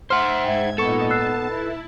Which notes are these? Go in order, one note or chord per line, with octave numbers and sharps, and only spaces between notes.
C5 E5 F#5 C6 F6
G#2 E5 G5 G#6
A#2 B3 D#4 A4 C#6 C#7
A5 E6 F#6 C7
E4 B4